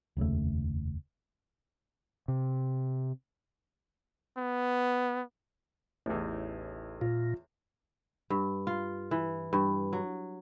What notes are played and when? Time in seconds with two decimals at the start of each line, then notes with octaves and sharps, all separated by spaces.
0.17 F1 D#2 C#3 A3
2.28 C3
4.38 B3
6.06 A1 E2 A2 D#4
7.01 A#2 F4
8.30 G2
8.67 F4
9.11 E3
9.53 G2
9.93 F#3